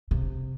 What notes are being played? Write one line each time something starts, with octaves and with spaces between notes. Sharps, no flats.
C3